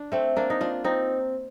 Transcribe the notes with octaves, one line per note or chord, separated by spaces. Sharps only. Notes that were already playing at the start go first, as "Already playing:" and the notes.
Already playing: D4
A3 C4
A#3 D4
D#4
D4 F4
C4 D#4